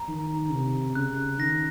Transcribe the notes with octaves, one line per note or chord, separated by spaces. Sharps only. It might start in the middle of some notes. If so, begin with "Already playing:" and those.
Already playing: A#5
D#3
C3
C#3 F#6
D#3 A#6